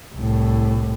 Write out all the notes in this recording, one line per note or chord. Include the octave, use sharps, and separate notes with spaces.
C2 A2